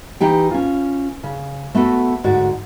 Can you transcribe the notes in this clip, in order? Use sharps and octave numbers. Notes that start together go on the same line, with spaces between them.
E3 D#4 G4 G5
C#4 F4
C#3
A3 B3 F#4 A4
D2 G#2 F#4 D5